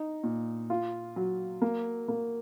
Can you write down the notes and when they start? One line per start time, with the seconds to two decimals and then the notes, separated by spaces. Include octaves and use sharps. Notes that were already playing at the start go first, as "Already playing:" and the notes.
Already playing: D#4
0.23 A#2
0.70 F4
1.16 F#3
1.62 A#3
2.08 A#3